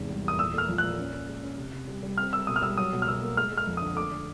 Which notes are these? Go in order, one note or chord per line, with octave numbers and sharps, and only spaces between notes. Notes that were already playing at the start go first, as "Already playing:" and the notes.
Already playing: E2 G#2 C3
G3
E2 D#6
A#2 E6
A3 F6
F3
A#2 F#6
C#4
C#4
G#3
C#4
C3
C3
G3
G3
C4 F6
G3 E6
B2 D#6
F6
G3 E6
F#3 D#6
B2
F6
B2 E6
A#3
G#3 F6
G#3
F6
F2
D3 D#6
A3 D6
D3